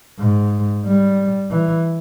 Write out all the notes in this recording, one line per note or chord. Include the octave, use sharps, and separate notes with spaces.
G#2
G3
E3